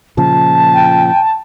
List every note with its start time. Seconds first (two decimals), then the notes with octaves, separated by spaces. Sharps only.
0.17 A#2 C#3 F3 A5
0.74 G5